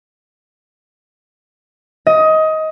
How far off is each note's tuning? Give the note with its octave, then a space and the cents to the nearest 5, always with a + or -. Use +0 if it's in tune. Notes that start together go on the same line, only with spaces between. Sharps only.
D#5 +20